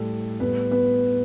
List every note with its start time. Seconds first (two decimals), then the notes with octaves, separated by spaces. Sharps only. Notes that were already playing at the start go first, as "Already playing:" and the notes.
Already playing: A2 G3 A4
0.40 A2 G3 B3 B4
0.71 B3 B4